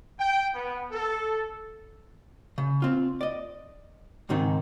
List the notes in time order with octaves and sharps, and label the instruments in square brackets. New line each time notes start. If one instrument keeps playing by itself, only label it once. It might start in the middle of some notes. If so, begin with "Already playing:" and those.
[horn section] G5
B3
A4
[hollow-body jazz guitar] C#3
C4 F4
D5 D#5
C#2 G#2 D#3 C4 D#4